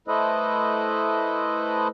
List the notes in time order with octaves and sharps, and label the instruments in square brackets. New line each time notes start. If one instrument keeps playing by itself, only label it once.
[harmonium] A3 E4 A4 B4 C5 D#5